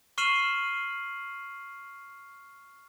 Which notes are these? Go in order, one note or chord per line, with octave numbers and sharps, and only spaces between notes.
C#6 F6 C7 D#7 E7 F#7